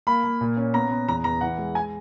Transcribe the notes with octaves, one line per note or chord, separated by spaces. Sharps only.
A#3 B5
A#3
A#2
C#4
B3 A#5
B3
E2 A#5
E2 A#5
E3 F#5
G#3
G#5